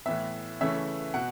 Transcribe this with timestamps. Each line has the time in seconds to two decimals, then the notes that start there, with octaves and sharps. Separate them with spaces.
0.06 A2 E3 B3 E5
0.61 C#3 E3 A3 C#4 E5
1.14 B2 F#5